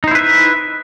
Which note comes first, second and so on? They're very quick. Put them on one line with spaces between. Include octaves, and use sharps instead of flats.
D#4 C5 E4 B4 E5